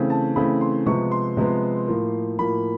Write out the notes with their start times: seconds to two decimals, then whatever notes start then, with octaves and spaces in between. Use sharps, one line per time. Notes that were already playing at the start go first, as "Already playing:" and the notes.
Already playing: C#3 E3 A3 C4
0.10 A5
0.36 C#3 E3 A3 C4 B5
0.61 C6
0.86 C3 F3 G#3 B3 C#6
1.11 C6
1.37 C3 F3 G#3 B3
1.88 A2 F3 A#3
2.39 A2 F3 A#3 B5